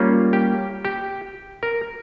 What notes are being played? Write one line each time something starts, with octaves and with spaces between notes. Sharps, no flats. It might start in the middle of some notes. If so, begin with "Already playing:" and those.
Already playing: G3 A#3 C#4 F4
G4
G4
A#4